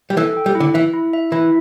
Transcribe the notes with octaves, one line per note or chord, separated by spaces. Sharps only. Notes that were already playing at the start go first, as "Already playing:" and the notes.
G3
E3 A4
G5
G3
E4
D3
E3 E5
E4
E5
E3 E4